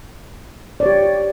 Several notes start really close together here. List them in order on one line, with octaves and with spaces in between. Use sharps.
D5 C#5 G4